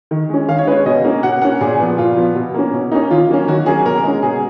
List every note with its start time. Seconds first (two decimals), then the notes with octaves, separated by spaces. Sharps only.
0.11 D#3
0.29 G#3 C#4
0.48 D#3 F5
0.58 C#5
0.67 G#3 C#4 B4
0.77 C#5
0.86 B2 D#5
1.05 A#3 C#4
1.23 B2 F#5
1.42 A#3 C#4 F#5
1.61 A#2 G#4
1.80 F3 B3
1.98 A#2 F4
2.17 F3 B3
2.35 B2
2.54 A#3 C#4
2.73 B2
2.92 A#3 D#4
2.95 C#4
3.10 D#3 F4
3.29 F#3 A#3 C#4
3.47 D#3 F#4
3.66 F#3 A#3 C#4 G#4
3.86 B2 A#4
4.03 G#3 C#4
4.22 B2 G#4